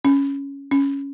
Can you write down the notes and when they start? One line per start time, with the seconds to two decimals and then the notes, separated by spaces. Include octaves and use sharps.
0.05 C#4
0.71 C#4